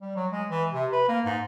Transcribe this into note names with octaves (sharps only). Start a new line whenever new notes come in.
G3
F#3
G#3
E3
C3
B4
A#3
G#2